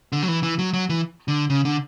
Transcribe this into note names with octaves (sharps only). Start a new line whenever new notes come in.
D3
F#3
E3
E3
F#3
F#3
E3
D3
C#3
D3